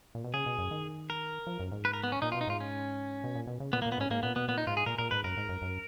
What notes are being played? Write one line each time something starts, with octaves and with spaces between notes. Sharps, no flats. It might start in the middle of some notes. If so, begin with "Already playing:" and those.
A#2
B2
C#3 G#4
B2
F#2
D#3
A#4
F3
F#2
G#2
B4
A#4
B3
C#4
A#2 D#4
F4
B2
D#4
G#2 F4
C#4
B2
A#2
B2
C#3
A#2 B3
A#3
A#2
B3
G#2 C#4
G#2 A#3
A#2 B3
B2 B3
A#2 B3
D#4
G#2 F4
G#4
A#2 A#4
A#2 A#4
G#2 B4
F#2 A#4
G#2
F#2
F#2